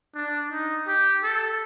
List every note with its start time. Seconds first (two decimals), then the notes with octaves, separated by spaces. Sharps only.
0.15 D4
0.51 D#4
0.88 G4
1.24 A4